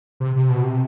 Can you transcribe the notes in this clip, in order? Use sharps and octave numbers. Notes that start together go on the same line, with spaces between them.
C3
C3
B2
C3